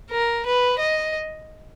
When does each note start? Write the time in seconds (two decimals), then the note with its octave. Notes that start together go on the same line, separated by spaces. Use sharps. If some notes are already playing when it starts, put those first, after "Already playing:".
0.11 A#4
0.46 B4
0.79 D#5